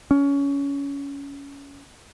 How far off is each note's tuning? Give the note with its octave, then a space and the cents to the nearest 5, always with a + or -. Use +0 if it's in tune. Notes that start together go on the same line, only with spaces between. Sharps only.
C#4 +20